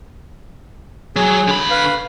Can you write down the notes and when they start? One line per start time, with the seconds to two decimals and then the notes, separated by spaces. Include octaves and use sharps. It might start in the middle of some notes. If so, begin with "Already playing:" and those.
1.16 F#3 G#4
1.48 D3 B5
1.70 B4 F5